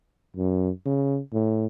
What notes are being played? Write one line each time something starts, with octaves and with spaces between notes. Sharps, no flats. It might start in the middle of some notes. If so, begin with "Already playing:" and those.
F#2
C#3
A2